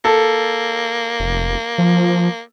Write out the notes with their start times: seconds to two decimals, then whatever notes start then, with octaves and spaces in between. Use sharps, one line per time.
0.05 A#3 A4
1.20 F1
1.78 F3